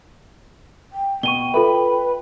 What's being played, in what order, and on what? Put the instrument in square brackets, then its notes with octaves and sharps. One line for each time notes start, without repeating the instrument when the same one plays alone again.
[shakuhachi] G5
[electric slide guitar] B2 [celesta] C#6 D#7 G7
[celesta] F4 A4 E5 [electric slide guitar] B4